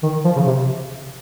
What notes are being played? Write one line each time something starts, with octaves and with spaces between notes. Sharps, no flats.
D#3
F3
C#3
C3